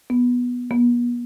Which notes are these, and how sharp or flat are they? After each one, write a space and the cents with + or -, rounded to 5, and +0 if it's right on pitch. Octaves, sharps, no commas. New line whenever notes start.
B3 -10
B3 -40